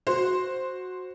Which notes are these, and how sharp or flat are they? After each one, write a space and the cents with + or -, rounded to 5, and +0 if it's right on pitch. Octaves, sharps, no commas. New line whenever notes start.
F#4 -10 C5 +0